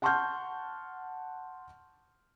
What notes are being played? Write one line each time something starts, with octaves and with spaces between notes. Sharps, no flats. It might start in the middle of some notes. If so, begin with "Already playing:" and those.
F#5 A5 C6 C#6 F6 G6